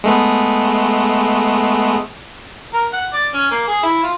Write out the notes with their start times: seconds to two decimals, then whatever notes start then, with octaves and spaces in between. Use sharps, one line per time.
0.04 G#3 A3 B3
2.74 A#4
2.93 F#5
3.13 D5
3.34 C#4
3.51 A#3
3.68 G#4
3.83 E4
4.03 F4